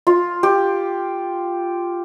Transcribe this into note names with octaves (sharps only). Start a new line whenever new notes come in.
F4
G4